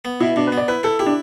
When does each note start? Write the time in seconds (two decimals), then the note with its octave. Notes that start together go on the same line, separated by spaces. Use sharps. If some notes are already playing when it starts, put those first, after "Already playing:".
0.05 B3
0.20 B2 E4
0.36 B2 D4
0.47 B4
0.52 B3
0.57 D5
0.68 E4 B4
0.83 E4 A4
0.99 E4 G4
1.06 D4